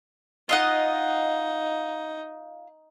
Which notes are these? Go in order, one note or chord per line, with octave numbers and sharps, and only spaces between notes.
D#4 F4 D#5 F#5